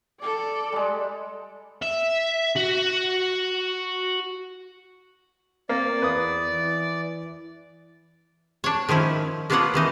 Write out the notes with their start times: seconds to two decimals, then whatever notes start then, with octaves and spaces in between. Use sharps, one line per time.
0.20 A4 D5
0.73 G3 G#3
1.82 E5
2.56 F#4
5.69 A#3 C4 D5
6.02 E2 B4 D#6
6.49 E3
8.64 D4 C#5
8.89 D#3 F3 C#4 E4
9.50 A#3 B3 D4 F4 C#5 F#5
9.74 D#3 E3 D#4